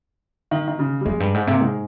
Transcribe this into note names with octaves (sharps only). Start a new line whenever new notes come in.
D#3
D#3
C#3
G3
F2 G#3
G2
G#2
C3 A#3
G#2 G#3